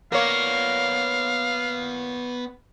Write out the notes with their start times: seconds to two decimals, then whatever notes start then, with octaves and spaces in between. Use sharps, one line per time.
0.12 A#3 B3 C#5 D5 F5